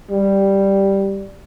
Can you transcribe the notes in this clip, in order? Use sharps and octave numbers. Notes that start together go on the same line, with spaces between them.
G3